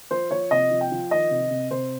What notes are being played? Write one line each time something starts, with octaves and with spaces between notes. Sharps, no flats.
F3 C5
F3 C#5
C3 D#5
F3
G5
F3
D#3 D#5
C3
C3
C3 C5